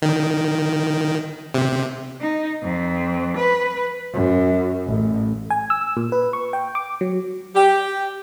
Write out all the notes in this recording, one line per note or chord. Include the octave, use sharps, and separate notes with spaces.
D#3
C3
D#4
F2
B4
F#2
A1
G#5
E6
A#2
B4
C#6
G5
D6
F#3
G4